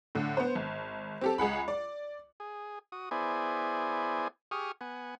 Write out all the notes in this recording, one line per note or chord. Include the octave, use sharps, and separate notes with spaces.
A2 D3
B3 C5
G#1
C4 G4 A4
C#2 G#4 F#5 B5
D5
G#4
F#4 D#6
B3 E4 G#4 C5 D5 G#5
G4 G#4 C#6 D#6 F6
B3 F#5 G#5